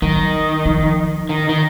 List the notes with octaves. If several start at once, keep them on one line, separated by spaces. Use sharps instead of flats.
D#3 F#3
F3
D#3
D#3